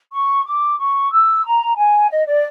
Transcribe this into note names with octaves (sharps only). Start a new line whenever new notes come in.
C#6
D6
C#6
E6
A#5
G#5
D#5
D5